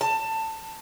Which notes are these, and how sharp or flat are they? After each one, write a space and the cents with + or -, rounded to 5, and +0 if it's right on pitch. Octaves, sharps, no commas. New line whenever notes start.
A5 +20